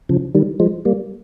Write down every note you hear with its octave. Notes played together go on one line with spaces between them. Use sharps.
C#3 F3
D#3 G3
F3 G#3
G3 A#3